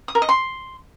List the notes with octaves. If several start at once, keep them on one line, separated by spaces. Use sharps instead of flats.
D#6
A#4
D#5
C6